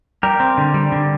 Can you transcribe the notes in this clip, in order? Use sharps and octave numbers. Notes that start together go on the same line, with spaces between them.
G3 G4 A#4
C4
D3
G3
D3